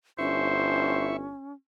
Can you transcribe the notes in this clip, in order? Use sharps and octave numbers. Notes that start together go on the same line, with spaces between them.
G1 C#4 E4 C5 E5 C#6